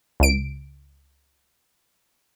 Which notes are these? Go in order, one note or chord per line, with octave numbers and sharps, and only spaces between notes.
C#2 D7